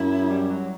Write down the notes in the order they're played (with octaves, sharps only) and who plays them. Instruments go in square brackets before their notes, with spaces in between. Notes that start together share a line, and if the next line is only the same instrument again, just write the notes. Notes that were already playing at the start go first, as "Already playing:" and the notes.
Already playing: [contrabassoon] F#2 [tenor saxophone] E4
[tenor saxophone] G3
F#3